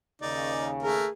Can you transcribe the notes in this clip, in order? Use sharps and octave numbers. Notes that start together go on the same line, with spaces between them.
D#2 C#3 D#4 D5
A3 G#4 A#4